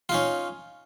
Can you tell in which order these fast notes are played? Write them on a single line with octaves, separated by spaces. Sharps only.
F4 D#4 C#4